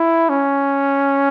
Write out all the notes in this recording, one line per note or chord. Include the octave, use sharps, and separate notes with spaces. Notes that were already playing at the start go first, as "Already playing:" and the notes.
Already playing: E4
C#4